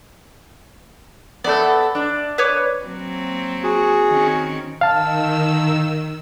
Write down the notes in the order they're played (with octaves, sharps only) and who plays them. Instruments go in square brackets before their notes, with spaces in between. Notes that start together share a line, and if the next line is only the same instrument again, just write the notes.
[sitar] B3 A4 [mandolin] D5 E5 G6
[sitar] D4
[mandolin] B4 C#5 D6
[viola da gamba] F#3 A#3 C4
[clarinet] F#4 [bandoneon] G#4
[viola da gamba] D#3 C4 C#4
[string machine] D#3 E6 [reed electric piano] F5 A5